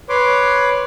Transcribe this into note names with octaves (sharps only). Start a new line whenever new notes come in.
B4 C#5 C6 D6